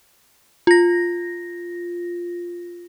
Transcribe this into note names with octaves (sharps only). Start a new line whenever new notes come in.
F4 A#6